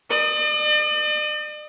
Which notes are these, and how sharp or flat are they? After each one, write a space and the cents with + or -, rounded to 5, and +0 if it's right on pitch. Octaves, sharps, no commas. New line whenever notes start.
D5 +45 D#6 +5